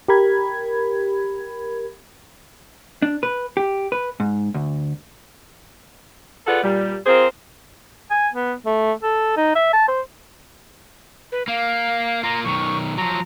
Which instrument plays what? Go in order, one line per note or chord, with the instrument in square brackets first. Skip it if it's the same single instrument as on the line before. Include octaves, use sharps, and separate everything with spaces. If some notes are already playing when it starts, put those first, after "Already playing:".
[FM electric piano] G4 A#4 B5 G#6
[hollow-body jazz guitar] D4
B4
G4
B4
G#2
D2
[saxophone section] F4 G#4 A4 B4 D5 F#5
A#2 G3
C4 F4 G#4 A#4 C5
[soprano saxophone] G#5
B3
A3
A4
D#4
E5
A5
C5
[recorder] B4
[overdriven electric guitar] A#3 [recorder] F5
[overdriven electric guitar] A#3 F4 [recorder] A#5
[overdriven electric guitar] B1 D#3 [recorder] C#6
[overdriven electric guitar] F3 F#3 [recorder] A#5